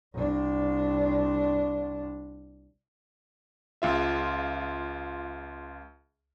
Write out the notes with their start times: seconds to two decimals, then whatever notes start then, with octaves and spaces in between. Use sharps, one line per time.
0.14 C2 D4
3.82 C#2 F4 E5